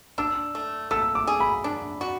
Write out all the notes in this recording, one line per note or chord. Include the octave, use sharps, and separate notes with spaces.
D4 E6
A3
A3 E6
D6
G#4
B5
D4
F#4